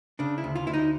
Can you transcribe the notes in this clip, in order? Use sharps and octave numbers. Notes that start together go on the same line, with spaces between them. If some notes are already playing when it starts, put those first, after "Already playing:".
C#3 D4
E4
D2
F4
D2 E4
D#4